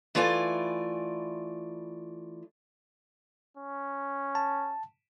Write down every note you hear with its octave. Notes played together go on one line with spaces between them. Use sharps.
E3 A3 F4 D5 G#5
C#4
A5